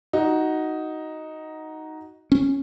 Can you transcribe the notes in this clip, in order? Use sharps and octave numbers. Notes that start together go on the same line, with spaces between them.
D#4 F#4
C#4